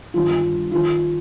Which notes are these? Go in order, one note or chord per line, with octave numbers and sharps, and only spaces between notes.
G1 G2 D#3 G3 F4
D#3 F4